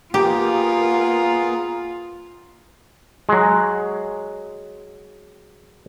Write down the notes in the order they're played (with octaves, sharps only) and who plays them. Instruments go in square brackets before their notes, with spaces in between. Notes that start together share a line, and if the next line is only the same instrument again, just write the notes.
[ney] A#3 [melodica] B3 G#4 A#4 [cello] F4 [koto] G4
[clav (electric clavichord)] F#3 G#3